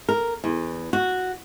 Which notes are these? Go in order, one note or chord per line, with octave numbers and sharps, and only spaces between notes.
A#4
E2
F#4